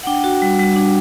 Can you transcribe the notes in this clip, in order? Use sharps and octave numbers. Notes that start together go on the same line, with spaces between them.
F#5
D4 G5
F#4
G3
G3
D4